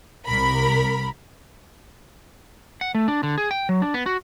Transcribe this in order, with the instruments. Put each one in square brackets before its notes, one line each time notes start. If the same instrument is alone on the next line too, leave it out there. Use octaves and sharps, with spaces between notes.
[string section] C2 A#4 B5
[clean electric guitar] F#5
A3
D4
D3
G#4
G5
F#3
D4
B3
F#4